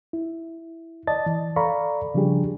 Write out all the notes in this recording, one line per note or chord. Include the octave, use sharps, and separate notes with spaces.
E4
D5 D#5 A5 A6
E3
A4 D5 F5 A#5 B5 C#6
C#3 F3 G3 D4 G4 G#4